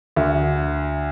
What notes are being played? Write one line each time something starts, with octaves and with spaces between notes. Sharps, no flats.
D2